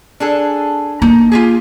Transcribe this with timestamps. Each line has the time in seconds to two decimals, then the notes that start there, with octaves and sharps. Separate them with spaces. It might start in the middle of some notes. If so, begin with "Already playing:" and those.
0.20 D4 G#4 A4
1.02 A#3 D#4
1.32 F4 G4 G#4